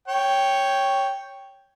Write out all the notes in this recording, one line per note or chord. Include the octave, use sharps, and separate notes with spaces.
C#5 G5